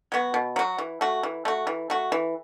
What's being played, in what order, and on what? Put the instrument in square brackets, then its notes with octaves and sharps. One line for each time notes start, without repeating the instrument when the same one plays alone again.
[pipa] F#3 B3 F#4
B2
F#3 B3 F#4
E3
A3 F#4
E3
A3 F#4
E3
A3 F#4
E3